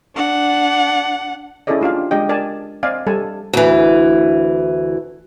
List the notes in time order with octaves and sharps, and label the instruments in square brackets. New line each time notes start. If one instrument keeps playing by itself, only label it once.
[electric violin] D4 F#5
[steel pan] C#4 E4 G#4 A4 D5 D#5
D4 F4 G4 F5
G#3 D4 G4 D#5 G5
A#4 D5 G#5 A5
C4 D5 D#5 F5 G#5
G3 A4 G#5 A5
[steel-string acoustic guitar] D2 E3